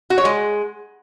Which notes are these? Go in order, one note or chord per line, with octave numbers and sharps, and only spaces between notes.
F#4
C#5
G#3